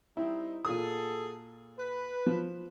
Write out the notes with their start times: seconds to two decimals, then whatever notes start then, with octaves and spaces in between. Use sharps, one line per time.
0.17 G3 C4 D#4 E4
0.65 A#2 F#4 G#4 A4 D#6
1.78 B4
2.26 F3